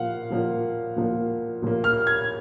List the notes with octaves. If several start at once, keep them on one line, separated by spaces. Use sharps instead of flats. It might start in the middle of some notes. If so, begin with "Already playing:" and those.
Already playing: A#2 F3 A#3 F5 F#5
A#2 F3 A#3
A#2 F3 A#3
A#2 F3 A#3
F6
G#6